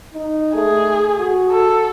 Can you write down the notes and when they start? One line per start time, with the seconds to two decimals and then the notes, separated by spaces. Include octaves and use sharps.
0.14 D#4
0.55 A3 G#4
1.19 F#4
1.51 A4